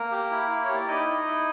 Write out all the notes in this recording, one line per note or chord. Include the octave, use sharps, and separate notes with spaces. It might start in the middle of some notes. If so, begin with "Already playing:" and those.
Already playing: A#3 A#4
G4
E4
E4
C#5
G4
D5
D#4 E4 D#5
E4
E4